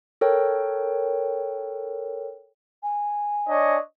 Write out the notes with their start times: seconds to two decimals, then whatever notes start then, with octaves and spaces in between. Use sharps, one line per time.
0.21 A4 A#4 C#5 G5
2.83 G#5
3.48 D4 C#5 D#5